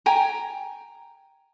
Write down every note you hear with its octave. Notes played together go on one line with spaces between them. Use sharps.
G5 G#5 A#5